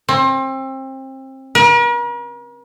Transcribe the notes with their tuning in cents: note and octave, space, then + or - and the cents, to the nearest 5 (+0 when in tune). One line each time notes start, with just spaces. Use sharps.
C4 +30
A#4 +45